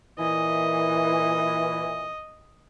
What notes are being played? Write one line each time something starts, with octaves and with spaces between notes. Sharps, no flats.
A#2 E3 D#5